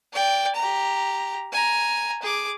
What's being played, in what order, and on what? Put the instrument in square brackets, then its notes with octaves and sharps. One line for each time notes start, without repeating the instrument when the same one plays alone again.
[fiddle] D5 G5
G4 A#5
G#5 A#5
G#4 D6